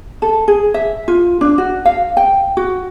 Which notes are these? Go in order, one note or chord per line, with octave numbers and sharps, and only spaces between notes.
A4
G#4
E5
F4
D4
F#4
F5
G5
F#4